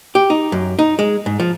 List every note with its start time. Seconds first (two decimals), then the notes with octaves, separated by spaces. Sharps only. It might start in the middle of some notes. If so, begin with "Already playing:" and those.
0.15 G4
0.30 D#4
0.52 F#2
0.79 D#4
0.99 G#3
1.26 G#2
1.40 F3